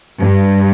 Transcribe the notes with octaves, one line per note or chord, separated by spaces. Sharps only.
G2